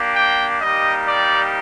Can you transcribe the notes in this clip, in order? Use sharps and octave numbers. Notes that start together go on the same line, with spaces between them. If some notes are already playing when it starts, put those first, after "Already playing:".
Already playing: A#3 D4 G4
G5
G3 A#3 D#4 G4 D#5
D5